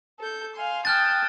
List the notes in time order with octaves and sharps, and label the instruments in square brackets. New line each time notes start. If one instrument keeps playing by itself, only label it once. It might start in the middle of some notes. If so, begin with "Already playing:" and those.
[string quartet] A4 G6
F5 G#5 C6
[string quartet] G5 A5 D#6 [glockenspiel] F6 F#6 A6